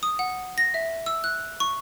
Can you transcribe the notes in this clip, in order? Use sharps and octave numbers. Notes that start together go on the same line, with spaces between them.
D#6
F#5
A#6
E5
E6
F#6
C#6